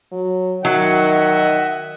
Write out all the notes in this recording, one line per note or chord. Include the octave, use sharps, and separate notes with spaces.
F#3
D#3 F#3 D#5 E5 F#5